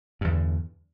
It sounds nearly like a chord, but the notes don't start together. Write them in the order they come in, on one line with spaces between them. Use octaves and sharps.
G2 E2 D3